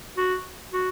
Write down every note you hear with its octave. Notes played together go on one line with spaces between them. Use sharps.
F#4
F#4